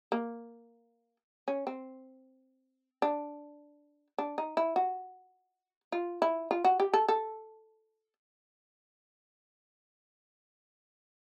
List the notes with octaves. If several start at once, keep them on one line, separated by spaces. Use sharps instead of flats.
A#3
C#4
C4
D4
D4
D#4
E4
F#4
F4
E4
F4
F#4
G4
A4
A4